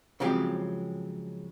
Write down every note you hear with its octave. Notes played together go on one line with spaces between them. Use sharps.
C#3 F3 F#3 G#3 C4 G4